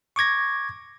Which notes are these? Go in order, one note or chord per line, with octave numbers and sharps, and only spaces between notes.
C#6 D6 G#6 A#6